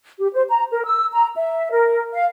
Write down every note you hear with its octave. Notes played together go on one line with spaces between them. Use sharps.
G4
C5
A#5
A#4
E6
A#5
E5
A#4
F5